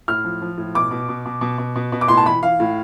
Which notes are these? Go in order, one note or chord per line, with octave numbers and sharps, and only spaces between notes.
A2 F6
F3
F3
A2
B2 D6
B2
B2
B2
B2
B2
B2
B2
D6
A2 C6
A5
E3 B5
E3 F5
A2